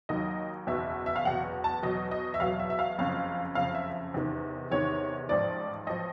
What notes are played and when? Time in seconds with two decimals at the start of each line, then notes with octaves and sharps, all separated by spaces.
0.09 D#2 D#3 F#3 D#5
0.67 F#1 E2 B2 E5
1.06 E5
1.16 F5
1.25 F#1 E2 B2 F#5
1.64 A5
1.83 E2 B2 F#3 D#5
2.11 D#5
2.34 E5
2.40 E2 B2 F#3 F5
2.60 E5
2.70 E5
2.79 F5
2.98 F#1 F2 C#3 F5
3.55 F#1 F2 C#3 F5
3.75 E5
4.14 E2 C3 D#3
4.71 E2 C3 D#3 C#5
5.29 A1 G#2 F3 D5
5.87 A1 F3 D#5